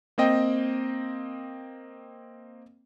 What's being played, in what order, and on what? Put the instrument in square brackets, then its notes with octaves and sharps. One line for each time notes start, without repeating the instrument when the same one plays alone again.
[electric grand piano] A#3 C4 D#5 G5